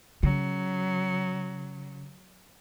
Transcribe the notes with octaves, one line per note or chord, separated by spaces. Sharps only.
C#3 F#3